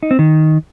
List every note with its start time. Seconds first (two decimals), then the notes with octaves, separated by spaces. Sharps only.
0.03 D#4
0.11 C4
0.19 D#3